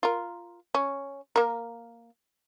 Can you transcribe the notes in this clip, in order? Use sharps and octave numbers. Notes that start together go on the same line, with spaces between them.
F4 A#4
C#4
A#3 A#4